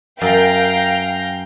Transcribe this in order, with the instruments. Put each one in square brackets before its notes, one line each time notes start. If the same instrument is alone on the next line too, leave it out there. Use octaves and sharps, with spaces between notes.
[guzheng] F#2 [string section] F5 G5 A#5